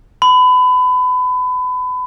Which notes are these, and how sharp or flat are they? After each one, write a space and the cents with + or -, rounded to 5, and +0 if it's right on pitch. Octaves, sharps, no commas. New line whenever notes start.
B5 +30